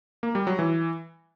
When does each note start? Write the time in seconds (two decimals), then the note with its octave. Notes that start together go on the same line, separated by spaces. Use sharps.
0.23 A#3
0.35 G3
0.47 F#3
0.59 E3